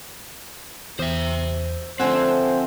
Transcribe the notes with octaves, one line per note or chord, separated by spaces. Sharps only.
E2 C5 E5
D3 F3 A3 C4 C5 F#5 G#5